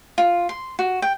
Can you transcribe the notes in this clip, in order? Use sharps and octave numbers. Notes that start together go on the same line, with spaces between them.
F4
C6
F#4
G5